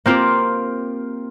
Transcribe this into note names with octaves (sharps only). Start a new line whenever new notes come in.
A#3 C4 F4 G4 A#4